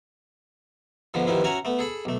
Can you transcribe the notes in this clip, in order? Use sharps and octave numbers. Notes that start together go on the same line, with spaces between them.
G#2 D3 F3 B3
G2 D#3 F3 B3 E4
C#4 F#4 E5 F#5 G#5 A#5
A3 B3
G#4 A4 B5
B1 A3